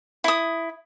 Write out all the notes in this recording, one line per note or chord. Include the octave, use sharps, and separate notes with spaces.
E4 D#6